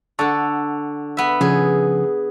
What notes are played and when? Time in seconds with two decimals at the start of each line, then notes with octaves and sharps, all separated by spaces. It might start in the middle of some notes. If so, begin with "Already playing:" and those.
0.19 D3 A4 F#5 A5 C#6
1.17 B3 E5
1.41 C#3 F3 C#4 G#4